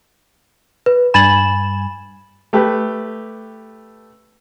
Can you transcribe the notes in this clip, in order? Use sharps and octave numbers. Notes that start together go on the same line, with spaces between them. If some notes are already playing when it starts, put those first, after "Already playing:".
B4
G2 G#5 B5 A6 E7 F#7
A3 G4 B4